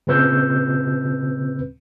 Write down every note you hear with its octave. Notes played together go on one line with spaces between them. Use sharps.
A#2 C#3 C4 B4 E6 G6